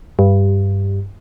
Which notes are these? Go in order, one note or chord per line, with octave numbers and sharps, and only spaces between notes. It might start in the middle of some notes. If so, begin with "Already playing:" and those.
G2